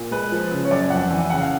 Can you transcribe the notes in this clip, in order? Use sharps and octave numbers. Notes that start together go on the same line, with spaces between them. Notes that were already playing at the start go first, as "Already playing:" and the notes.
Already playing: A#2
G#3 B4
F3
C#3
C#5
F#2 D5
F2 F#5
E3
C#3 F#5
F5